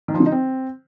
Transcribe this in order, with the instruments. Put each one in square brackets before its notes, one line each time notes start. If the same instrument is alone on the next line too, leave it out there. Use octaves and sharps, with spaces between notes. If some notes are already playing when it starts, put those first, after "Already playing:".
[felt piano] D#3
F3
D3
D#4
C4